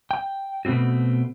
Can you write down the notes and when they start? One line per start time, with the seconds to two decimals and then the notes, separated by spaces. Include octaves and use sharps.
0.11 G5
0.65 B2 A3 B3 C4 F#4